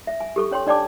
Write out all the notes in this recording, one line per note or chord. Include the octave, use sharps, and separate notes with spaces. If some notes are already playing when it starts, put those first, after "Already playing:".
E5
G#5
G4 A4 C#6
C#4 C#5 G5 C6
D4 D5 G5 A5 D6